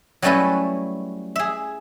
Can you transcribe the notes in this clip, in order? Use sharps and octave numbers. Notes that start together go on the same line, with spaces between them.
F#3 G3 A3 C#4 E4 B4
G#4 E5